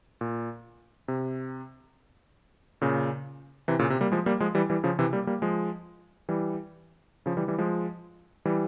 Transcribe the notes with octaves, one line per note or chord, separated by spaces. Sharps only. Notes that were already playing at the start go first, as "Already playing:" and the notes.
A#2
C3
A#2 C#3
C3 E3
A#2 C#3
C3
G3 A#3
F3 G#3
G3 A#3
F3 G#3
E3 G3
E3 G3
C#3 F3
C3 E3
G3 A#3
G3 A#3
F3 G#3
E3 G3
C#3 F3
E3 G3
E3 G3
F3 G#3
E3 G3